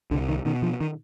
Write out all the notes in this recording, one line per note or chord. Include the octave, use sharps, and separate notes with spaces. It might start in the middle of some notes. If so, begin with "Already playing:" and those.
C2 D3
D#3
B2 D#3
F3
D#3